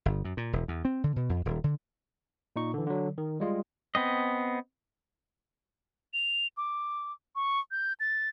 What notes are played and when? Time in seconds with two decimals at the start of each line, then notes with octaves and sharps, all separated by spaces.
0.06 G1
0.25 F#2
0.37 A#2
0.53 E1
0.68 E2
0.85 C4
1.04 D3
1.16 B2
1.29 F2
1.45 D#1
1.64 D3
2.56 A#2 D#4 C#6
2.74 D3 E3
2.87 D3 F#3
3.18 D#3
3.40 G3 G#3 F4
3.95 B3 C4 D#5
6.14 F7
6.57 D6
7.36 C#6
7.71 G6
8.00 A6